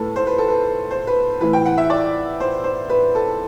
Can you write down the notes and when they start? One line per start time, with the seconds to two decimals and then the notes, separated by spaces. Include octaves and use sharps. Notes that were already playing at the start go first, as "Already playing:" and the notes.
Already playing: A2 A4 B4
0.16 C5
0.27 B4
0.38 A4
0.48 B4
0.91 C5
1.07 B4
1.41 A2 E3 B4
1.53 G5
1.66 F#5
1.78 E5
1.90 D5
2.40 C5
2.64 C5
2.90 B4
3.15 A4